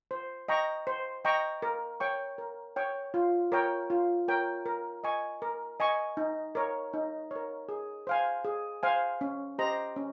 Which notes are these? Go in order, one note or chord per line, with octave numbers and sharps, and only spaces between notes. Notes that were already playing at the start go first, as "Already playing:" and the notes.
C5
D#5 G5 A#5 C#6
C5
D#5 G5 A#5 C#6
A#4
C#5 G5 C#6
A#4
C#5 G5 C#6
F4
A#4 C#5 G5
F4
A#4 C#5 G5
A#4
D#5 G#5 C#6
A#4
D#5 G#5 C#6
D#4
A#4 C#5
D#4
A#4 C#5
G#4
C5 F5 G#5
G#4
C5 F5 G#5
C#4
G4 C5 D#5 A#5
C#4